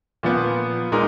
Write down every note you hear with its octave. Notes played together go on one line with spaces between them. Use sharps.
A#2 F3 B3
A#2 G#3 D#4 A#4